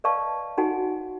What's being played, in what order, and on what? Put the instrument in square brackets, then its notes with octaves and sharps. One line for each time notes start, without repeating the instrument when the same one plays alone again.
[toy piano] B4 D5 D#5 F5 A5 C#6
D#4 F#4 F#5 G#5